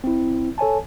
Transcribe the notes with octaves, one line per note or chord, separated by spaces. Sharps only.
C4 E4
A4 C#5 G#5 A5